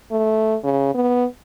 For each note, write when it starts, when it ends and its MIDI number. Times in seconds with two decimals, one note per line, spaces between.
0.11 0.56 57
0.64 0.90 49
0.95 1.25 59